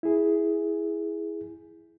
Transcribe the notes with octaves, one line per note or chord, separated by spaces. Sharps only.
E4 G#4